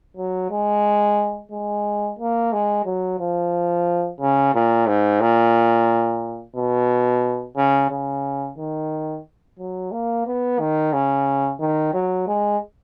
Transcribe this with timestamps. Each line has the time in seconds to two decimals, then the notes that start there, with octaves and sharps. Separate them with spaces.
0.17 F#3
0.51 G#3
1.52 G#3
2.19 A#3
2.53 G#3
2.85 F#3
3.19 F3
4.21 C#3
4.54 A#2
4.88 G#2
5.21 A#2
6.56 B2
7.56 C#3
7.91 C#3
8.58 D#3
9.59 F#3
9.92 A#3
10.26 B3
10.60 D#3
10.93 C#3
11.60 D#3
11.94 F#3
12.28 G#3